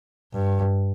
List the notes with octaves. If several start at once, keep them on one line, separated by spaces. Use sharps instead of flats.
G2